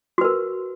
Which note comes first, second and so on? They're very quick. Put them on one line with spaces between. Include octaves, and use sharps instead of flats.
F#4 B4 A#4